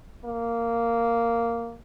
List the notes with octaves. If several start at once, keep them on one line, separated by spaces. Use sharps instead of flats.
A#3